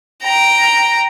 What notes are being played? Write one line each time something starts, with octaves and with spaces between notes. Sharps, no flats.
G5 A#5